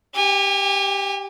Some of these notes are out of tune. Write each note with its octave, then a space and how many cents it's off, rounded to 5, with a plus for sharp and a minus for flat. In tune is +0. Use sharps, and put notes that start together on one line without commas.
G4 +0 G#5 -40